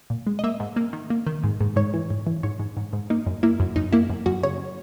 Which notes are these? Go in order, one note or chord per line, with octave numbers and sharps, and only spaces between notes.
A#2
G#3
D#5
A#3 E5
G#2
A#3
D#3
A#3
D#3
G#2
G#2
G#2 C#5
E3
G#2
E3
G#2 C#5
G#2
G#2
G#2
A#3 D#4
F#2
A#3 E4
F#2
F#2 D#4
A#3 E4
F#2
F#2 F#4
C#3 C#5